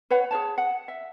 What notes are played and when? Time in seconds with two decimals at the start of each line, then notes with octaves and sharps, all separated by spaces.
0.10 B4 C#5 F#5
0.31 G#4 A4 C#5 A5
0.58 F#5
0.88 E5